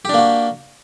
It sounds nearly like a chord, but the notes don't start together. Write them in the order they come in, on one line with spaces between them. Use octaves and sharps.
G4 D4 A#3 F#4